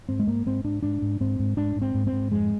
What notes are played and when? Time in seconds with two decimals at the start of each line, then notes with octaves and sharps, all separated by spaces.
0.09 G#2 C4
0.20 G#3
0.27 G#2 A#3
0.46 G#2 C4
0.64 G#2 D4
0.83 G#2 D4
1.02 G#2
1.20 G#2 C4
1.39 G#2
1.57 G#2 D4
1.76 G#2
1.82 C4
1.95 G#2
2.07 C4
2.13 G#2
2.31 F2 G#3